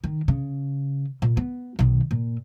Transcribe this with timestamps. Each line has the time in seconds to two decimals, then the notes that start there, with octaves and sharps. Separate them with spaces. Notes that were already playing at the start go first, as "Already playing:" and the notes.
0.04 D#3
0.28 C#3
1.22 A#2
1.37 B3
1.79 B1 D#3
2.11 A#2